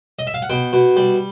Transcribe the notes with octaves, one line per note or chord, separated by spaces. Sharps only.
D#5
E5
F5
F#5
B2 G5
B2
G3